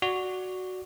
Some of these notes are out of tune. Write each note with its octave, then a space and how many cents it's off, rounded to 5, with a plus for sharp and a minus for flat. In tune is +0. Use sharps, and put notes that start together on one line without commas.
F#4 +0 D5 +0